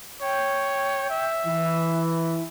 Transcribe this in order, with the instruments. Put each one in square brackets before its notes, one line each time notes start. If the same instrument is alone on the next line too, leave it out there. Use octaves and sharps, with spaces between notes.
[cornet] C#5 [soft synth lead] G5
[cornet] E5
[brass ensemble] E3 [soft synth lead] E4